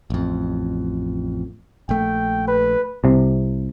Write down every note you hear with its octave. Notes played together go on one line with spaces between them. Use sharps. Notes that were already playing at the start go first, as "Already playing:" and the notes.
A1 F2
A#1 A3 G5
B4
C2 C3